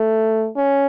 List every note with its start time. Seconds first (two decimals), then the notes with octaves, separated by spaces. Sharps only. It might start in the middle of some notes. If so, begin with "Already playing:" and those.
Already playing: A3
0.58 C#4